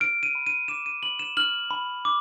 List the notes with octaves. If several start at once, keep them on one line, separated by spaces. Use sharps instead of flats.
F6 D7
D#7
B5
D#7
D6 E7
D#7
B5 F#7
E7
F6 F#7
B5
D6